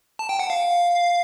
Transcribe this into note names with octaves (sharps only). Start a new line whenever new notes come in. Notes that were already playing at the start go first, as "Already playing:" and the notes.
A5
G5
F#5
F5